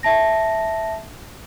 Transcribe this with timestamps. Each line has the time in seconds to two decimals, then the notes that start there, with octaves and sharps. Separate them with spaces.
0.03 E5 A5 A#6